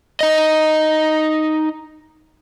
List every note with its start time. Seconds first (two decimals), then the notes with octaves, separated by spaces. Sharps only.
0.21 D#4 D#5